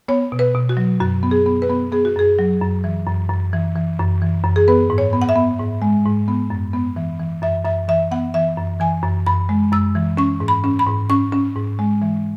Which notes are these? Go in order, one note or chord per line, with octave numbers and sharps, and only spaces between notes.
B3 C#5
B2
B4
B2
F#4
F#3
F#2 F#4
B3
G#4
B3
B4
B3
B3 G#4
F#4
F#2 G#4
F#3
F#2
E3
F#2
F#2
E3
E3
F#2
E3
F#2
G#4
B3 B4
G#2
C#5
B3
F#5
E5
B3
G#2
G#3
G#2
B3
F#2
B3
E3
E3
F#2 E5
F#2 E5
E3 E5
B3 F#5
E3 E5
F#2
E3 G#5
F#2
F#2 B5
G#3
F#2 E6
E3
C#4 C#6
G#2
B5
C#4
B5
G#2
C#4 C#6
C#4
G#2
G#3
E3